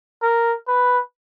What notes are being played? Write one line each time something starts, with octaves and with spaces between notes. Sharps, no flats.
A#4
B4